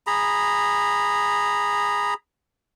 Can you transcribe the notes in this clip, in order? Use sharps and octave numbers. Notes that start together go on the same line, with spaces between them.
G#4 A#5 B5